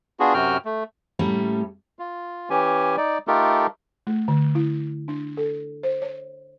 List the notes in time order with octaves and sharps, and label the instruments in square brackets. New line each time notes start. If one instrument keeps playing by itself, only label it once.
[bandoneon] B3 D4 F4 F#4 G#4
F#2 C3 F#4 G5 F6
A3
[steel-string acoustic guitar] A2 G3 A3 A#3 C#4
[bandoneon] F4
E3 C#4 G4 G#5
D#4 D5
A3 D#4 F4 G4 A4 A#4
[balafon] A3
D3
E4
D4
A4
C5
C#5